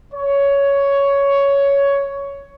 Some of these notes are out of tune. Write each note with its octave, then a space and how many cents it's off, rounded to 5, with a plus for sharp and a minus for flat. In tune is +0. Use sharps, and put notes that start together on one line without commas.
C#5 +10